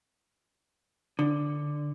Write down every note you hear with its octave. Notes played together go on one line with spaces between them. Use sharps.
D3